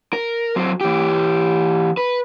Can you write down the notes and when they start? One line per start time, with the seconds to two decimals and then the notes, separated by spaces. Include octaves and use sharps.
0.13 A#4
0.56 F#3 C4
0.81 E3 G4
1.97 B4